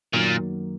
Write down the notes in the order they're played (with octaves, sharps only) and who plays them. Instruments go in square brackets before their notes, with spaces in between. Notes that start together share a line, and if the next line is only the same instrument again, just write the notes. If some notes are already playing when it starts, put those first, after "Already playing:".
[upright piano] F#2 D#3 F#3 A#3 [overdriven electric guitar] A#2